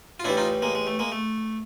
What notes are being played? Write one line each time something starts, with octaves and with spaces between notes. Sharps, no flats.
F4
A2 E3 G3 D4 E4
D#4 F4
G#3 A#3
G#3
A3
G#3 A#3
A3